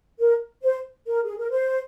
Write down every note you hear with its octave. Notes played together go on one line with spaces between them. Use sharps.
A#4
C5
A#4
G#4
A#4
C5